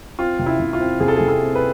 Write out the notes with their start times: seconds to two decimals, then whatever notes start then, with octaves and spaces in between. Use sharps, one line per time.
0.19 C4 F4
0.39 C3
0.46 E4
0.60 C3
0.73 F4
0.80 C4
1.00 C3 G#4
1.08 A4
1.16 G#4
1.21 C3
1.28 A4
1.42 C4
1.55 B4